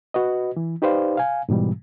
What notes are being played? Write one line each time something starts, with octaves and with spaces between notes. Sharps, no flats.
F#4 B4 D#5
E3
D#4 G4 B4 C5 D5 F5
F5 G#5
G#2 B2 E3 G3